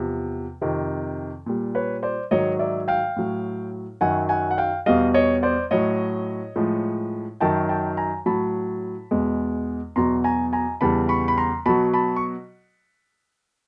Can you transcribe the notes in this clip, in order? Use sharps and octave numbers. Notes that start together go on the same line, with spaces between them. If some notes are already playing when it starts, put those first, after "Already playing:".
Already playing: E2 C3 F3
F2 C3 D#3
A#2 G3
B4 C#5
C5 D5
G#2 D#3 F#3 C#5 D#5
D5 E5
F5 G5
A2 F#3
F#2 D#3 F#3 F#5 G#5
F#5 G#5
F#5
F5 G5
E2 B2 G3 D#5 F5
C#5 D#5
C5 D5
A2 F#3 C#5 D#5
A2 F3 G#3
F#2 D#3 F#3 G5 A5
G5 A5
G#5 A#5
A2 F#3 A5 B5
E2 B2 G#3
E2 B2 F#3 A#5 C6
G#5 A#5
G#5 A#5
E2 C#3 E3 G3 A5 B5
B5 C#6
B5
A#5 C6
B2 F#3 A5 B5
A5 B5
C#6